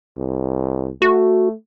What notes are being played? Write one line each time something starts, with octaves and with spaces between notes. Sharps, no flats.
C2
A3 F#4